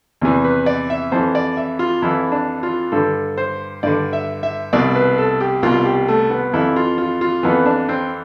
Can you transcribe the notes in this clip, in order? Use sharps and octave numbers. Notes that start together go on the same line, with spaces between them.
E2 C3 E3
B4
D5
E5
F2 E3 C5
D5
E5
F4
F2 E3 E4
D4
F4
G2 D3 A4
C5
G2 D3 D5
E5
E5
C2 B2 D5
B4
A4
G4
C2 B2 F4
G4
A3
B3
F2 E3 E4
F4
F4
F4
F2 E3 B3
D4
C4